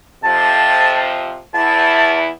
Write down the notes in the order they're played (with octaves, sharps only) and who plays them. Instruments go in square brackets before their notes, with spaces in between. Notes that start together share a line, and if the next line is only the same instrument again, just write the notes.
[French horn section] F2 C3 F3 [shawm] A5
[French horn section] E2 E4 [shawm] A5